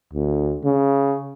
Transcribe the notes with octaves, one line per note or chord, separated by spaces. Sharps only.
D2
C#3